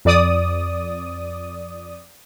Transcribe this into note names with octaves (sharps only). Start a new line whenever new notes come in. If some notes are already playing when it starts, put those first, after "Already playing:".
F2 D5 D#6